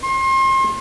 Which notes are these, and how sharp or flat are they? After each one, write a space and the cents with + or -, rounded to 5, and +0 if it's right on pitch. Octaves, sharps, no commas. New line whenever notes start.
C6 +35